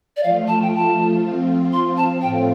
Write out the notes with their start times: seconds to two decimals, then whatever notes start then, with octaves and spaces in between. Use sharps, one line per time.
0.17 D5
0.23 F3 A3 F4 F5
0.48 A5
0.62 G5
0.76 A5
1.23 F3 C4 F4
1.73 C6
1.97 A5
2.22 A2 A3 C4 F4 G5